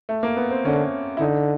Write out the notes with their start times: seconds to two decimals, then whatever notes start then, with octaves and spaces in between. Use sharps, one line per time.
0.09 A3
0.23 A#3
0.37 B3
0.51 C4
0.65 D3 C#4
1.17 E4
1.20 D3 D#4